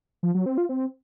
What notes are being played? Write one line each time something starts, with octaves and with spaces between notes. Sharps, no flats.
F3
F#3
C4
F4
C4